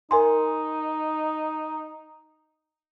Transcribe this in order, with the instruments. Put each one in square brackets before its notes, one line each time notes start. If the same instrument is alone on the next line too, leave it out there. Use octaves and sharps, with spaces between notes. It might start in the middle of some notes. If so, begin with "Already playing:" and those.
[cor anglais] D#4 [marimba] A#4 G#5 C6